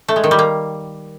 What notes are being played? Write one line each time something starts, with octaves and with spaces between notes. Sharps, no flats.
A3
G#3
D#3
G3
A#3